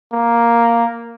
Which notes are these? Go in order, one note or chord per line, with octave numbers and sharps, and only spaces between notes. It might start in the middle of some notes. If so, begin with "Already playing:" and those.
A#3